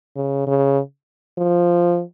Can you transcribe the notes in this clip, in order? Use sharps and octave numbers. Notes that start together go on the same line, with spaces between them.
C#3
C#3
F3